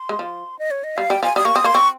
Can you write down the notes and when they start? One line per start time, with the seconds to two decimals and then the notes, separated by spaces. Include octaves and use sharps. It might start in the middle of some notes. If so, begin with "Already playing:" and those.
Already playing: C6
0.09 G#3
0.19 F3
0.59 D#5
0.71 C#5
0.84 D#5
0.97 G3 F5
1.10 G3 G5
1.23 F3 G#5
1.36 G3 D#6
1.45 A#3 C#6
1.56 C4 D#6
1.64 A#3 C6
1.74 C4 C#6